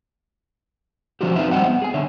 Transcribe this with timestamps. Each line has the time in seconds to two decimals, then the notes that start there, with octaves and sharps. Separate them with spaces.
1.21 F3 F#3 C#4 E4 F#4 G4
1.36 C4 D#4 E4 B4 E5
1.51 G3 C5 D#5 F#5 G5
1.67 B3
1.82 G#4 G#5
1.94 D3 C#5 E5